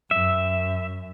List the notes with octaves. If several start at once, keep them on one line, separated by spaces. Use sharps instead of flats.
F#2 E5